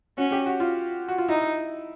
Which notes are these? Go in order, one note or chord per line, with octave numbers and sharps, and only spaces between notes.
C#4 F#4
G4
F#4
F4
F#4
F4
D#4 E4